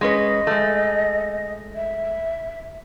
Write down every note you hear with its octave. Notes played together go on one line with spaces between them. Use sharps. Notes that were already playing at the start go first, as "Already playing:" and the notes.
G#3 C#4 B4 D#5
G#3 A3
E5